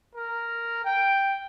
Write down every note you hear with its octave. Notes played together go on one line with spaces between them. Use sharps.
A#4
G5